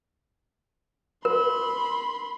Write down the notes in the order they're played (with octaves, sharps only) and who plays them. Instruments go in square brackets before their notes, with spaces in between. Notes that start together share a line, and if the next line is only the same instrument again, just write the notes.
[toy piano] A#4 [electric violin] B5 C6